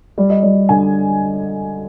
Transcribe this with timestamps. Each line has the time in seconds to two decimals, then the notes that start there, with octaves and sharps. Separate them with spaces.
0.18 G3 D5
0.30 D#5
0.43 G3 D5
0.69 D3 G#5